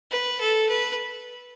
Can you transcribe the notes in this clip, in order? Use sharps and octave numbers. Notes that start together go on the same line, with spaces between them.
B4
A4
B4